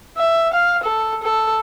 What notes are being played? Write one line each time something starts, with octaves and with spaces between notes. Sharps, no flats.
E5
F5
A4
A4